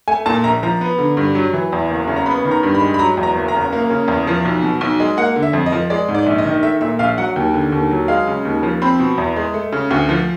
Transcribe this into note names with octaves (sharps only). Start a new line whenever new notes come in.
A3 G#5
A#2 A5
A#1 A#5
F3 A#5
B3
D3
G2
F#3
E3
E2
F#1
C#3
A#5
B3 B5
D#3
A#5
G2
B5
G#3
B5
F#3 A#5
E2
A#5
F#1
A#5
C#3
A#3
C#3
E2
F3
B1
B2
B1
G#3
A#3 F#5
D3
E5
F2
D#5
F3
G#3 D5
G#2
D5
A#1
D#5
D#3
A3 E5
A#2 E5
A#1 F5
F#3 F#5
D#2 G5
D3
D#2
F#3
G#3 F5
C#3
D#2
F3
C4 B5
B2
E2
G#3
A3
C#3
D2
F3